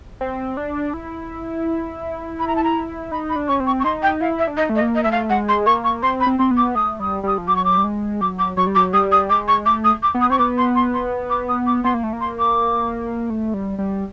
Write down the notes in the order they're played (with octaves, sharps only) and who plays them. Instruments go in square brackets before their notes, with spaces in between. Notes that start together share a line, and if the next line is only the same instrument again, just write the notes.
[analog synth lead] C4
D4
E4
[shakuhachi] B5
A#5
A5
A#5
[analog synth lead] D#4 [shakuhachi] B5
[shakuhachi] B5
[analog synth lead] D4
[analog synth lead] C#4 [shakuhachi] C#6
[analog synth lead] C4
[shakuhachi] C#6
C#6
[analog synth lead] D#4 [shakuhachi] C6
[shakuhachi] G5
[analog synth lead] E4 [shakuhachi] F5
[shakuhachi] E5
[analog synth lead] D4
[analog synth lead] D#4 [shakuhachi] D#5
[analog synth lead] A3
[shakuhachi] D#5
[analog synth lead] A#3
[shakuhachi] D#5
[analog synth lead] A3 [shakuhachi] E5
[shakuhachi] F5
[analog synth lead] G#3 [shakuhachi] F#5
[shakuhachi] C6
[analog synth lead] A#3 [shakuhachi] C#6
[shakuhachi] C#6
[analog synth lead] C4 [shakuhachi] C6
[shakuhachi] B5
[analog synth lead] C4
[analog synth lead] C4 [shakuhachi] C6
[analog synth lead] B3
[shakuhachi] D6
[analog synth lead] A3 [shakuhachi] D#6
[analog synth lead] G3 [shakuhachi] D#6
[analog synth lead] G3 [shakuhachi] D#6
[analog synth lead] F3
[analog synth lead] F#3 [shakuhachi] D6
[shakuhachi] C#6
D6
[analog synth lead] G3
G#3
[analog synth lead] F#3 [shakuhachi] D6
[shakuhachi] D6
[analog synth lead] F#3 [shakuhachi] C#6
[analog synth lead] G3
[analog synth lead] F#3 [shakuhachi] D6
[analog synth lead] G3 [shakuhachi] D#6
[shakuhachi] D#6
[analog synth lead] G#3 [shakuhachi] D6
[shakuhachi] C#6
[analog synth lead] A3 [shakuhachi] D6
[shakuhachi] D#6
D6
[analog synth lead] B3
[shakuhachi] D#6
[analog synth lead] C4 [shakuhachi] C#6
[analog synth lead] B3 [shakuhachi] D6
[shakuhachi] C6
C6
C6
D6
D#6
D6
[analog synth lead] B3 [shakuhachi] C6
[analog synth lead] A#3
A3
A#3
[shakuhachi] C6
D6
[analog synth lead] A3
G3
G3